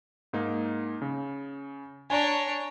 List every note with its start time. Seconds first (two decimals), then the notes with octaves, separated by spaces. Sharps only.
0.33 G#2 A#3 D#4
1.02 C#3
2.10 D4 C#5 G#5 A#5